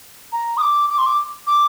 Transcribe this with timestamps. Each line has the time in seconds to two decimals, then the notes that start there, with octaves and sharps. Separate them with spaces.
0.33 A#5
0.57 D#6
0.61 D6
0.90 D6
0.98 C6
1.06 D6
1.47 D6